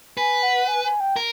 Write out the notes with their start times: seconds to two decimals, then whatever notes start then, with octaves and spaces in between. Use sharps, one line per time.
0.17 B4 G#5
0.42 F#5
0.67 G#5
0.84 G#5
1.00 G5
1.16 A#4